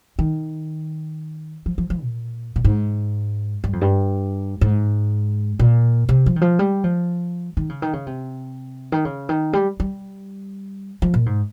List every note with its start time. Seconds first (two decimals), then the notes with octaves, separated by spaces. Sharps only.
0.19 D#3
1.66 F3
1.78 F3
1.90 F3
2.02 A#2
2.56 A#2
2.64 G#2
3.64 G2
3.73 F2
3.81 G2
4.61 G#2
5.59 A#2
6.09 C3
6.26 F3
6.36 D#3
6.41 F3
6.59 G3
6.84 F3
7.57 D#3
7.69 C#3
7.82 D#3
7.93 C#3
8.07 C3
8.92 D#3
9.05 C#3
9.29 D#3
9.53 G3
9.80 G3
11.02 F3
11.14 A#2
11.26 G#2